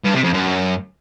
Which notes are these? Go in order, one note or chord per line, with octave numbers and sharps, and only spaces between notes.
G2
C3
F2
F#2